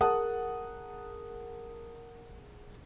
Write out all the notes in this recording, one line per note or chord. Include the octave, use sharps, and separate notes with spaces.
G#4 A#4 F#5 A5 D#6